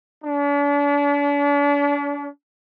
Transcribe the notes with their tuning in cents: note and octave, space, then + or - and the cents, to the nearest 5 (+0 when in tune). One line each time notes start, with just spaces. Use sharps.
D4 -40